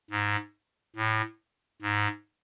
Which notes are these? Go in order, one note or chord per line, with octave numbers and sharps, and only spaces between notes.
G#2
A2
G#2